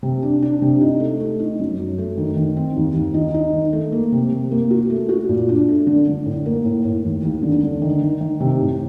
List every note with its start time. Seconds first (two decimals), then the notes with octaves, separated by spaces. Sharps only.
0.03 C3
0.22 D4
0.42 D4
0.62 C3
0.81 D#4
1.00 A3
1.20 A3
1.40 D#4
1.59 F#2
1.78 F#2
1.98 A3
2.18 D#3
2.37 D#3
2.57 C4
2.76 D#2
2.95 D#2
3.14 D#4
3.34 D#4
3.53 D#3
3.73 A3
3.92 A#3
4.12 C3
4.32 C3
4.51 A#3
4.71 F#4
4.90 A3
5.09 F#4
5.29 A#2
5.49 D4
5.68 A3
5.87 D3
6.07 D3
6.26 A2
6.46 A#3
6.65 A2
6.85 A2
7.05 D#2
7.24 D#2
7.43 D3
7.63 D3
7.82 D#3
8.02 D#3
8.21 D#3
8.40 C3
8.61 A2